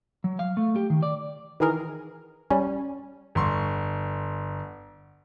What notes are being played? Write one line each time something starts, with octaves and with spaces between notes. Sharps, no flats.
F#3
F5
A3
G4
D#3
D5
D#3 E3 G#4 A#4
G3 C#4
G1 C6 C#6